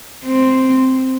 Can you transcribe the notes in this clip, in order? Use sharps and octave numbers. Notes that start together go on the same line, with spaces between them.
C4